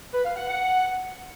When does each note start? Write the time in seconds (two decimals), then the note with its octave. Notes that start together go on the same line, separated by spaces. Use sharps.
0.13 B4
0.25 F5
0.37 F#5
0.48 F#5